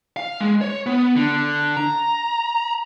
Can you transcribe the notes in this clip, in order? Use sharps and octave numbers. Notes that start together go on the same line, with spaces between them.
F5
G#3
C#5
B3
D3
A#5